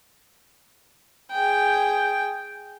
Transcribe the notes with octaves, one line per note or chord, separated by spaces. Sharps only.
G#4 G5